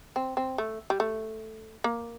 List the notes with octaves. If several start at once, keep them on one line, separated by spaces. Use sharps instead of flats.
C4
C4
A3
G3
A3
A#3